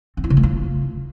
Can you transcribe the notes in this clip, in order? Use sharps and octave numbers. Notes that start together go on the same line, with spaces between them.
C4
E4
C#3
A3
F4